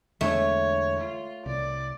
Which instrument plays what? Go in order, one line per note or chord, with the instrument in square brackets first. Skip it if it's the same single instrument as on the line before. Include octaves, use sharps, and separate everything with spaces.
[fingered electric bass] E2 D3 G#3 [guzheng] A3 [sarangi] C#5
[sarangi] F4
[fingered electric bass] C2 [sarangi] D5